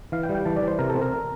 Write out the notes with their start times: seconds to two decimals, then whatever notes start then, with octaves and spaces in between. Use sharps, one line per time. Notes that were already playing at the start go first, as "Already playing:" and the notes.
0.12 E3 F5
0.23 G5
0.29 G3
0.35 G5
0.46 E3 A5
0.56 D5
0.62 E3
0.68 C5
0.79 C3 A#4
0.90 A4
0.95 C4
1.01 A#4